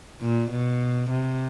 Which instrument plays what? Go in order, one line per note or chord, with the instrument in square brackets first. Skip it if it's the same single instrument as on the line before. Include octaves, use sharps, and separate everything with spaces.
[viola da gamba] A#2
B2
C3